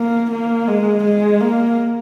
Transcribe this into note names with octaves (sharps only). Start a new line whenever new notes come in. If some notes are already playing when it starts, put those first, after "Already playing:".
Already playing: A#3
A#3
G#3
G#3
A#3